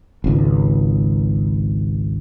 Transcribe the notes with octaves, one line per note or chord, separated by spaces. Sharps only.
G#1 C#2